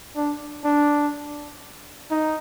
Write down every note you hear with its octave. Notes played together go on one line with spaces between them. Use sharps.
D4
D4
D#4